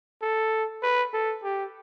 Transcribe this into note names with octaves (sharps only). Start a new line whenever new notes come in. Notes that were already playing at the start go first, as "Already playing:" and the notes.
A4
B4
A4
G4